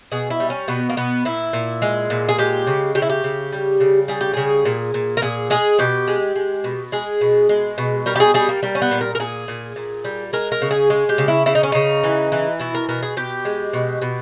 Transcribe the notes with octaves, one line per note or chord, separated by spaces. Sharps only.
B2 G#4
E4
G3
C#4
B2 B3
A#3
B2 B3
A#2 E4
A#2
G#3
A#2
G#4
G#3 G4
C#3
C#3 G4
E4
G4
C#3
G3
C#3
G3 G#4
G4
C#3 G#4
A#2
A#2
A#4
A#2 G#4
G#3 G#4
B2 G4
G#3
G#3
B2
G#3 G#4
B2
G#3
B2
G3 A#4
G4
G#4
G3 G#4
A#3
G3 A#3
C#4
B3
A#2
A#4
A#4
A#2 G#4
A#2
A#2
G3
G#3 A#4
A#4
C#3
G#4
G#3
G4
C#3
E4
C#3 E4
D#4
C#4
C#3 D#4
E3
E3
B2 E4
A#4
B2 A#4
G#4
B2 G4
G#3
B2
B2